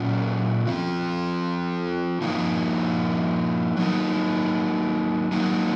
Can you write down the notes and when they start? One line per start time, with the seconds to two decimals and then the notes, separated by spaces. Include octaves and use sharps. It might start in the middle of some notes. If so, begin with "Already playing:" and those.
Already playing: A#2 F#3 C#4 F4
0.66 F3 C4 F4
2.21 F3 A#3 D#4
3.76 F#3 A#3 D#4
5.32 F#3 A#3 D#4